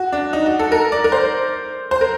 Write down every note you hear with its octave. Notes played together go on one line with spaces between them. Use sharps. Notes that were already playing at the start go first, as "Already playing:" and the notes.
Already playing: F#4
D4
D#4
F#4
A4
A#4
D5
A#4
C5
C5
A#4